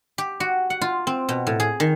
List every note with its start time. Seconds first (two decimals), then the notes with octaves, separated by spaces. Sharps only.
0.18 G4
0.40 F#4
0.70 F#5
0.81 F4
1.07 C4
1.29 B2
1.47 A2
1.60 G#4
1.80 D#3